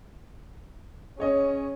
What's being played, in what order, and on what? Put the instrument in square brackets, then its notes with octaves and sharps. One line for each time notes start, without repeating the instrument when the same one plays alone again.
[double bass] C#4 [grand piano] G#4 C#5 D#5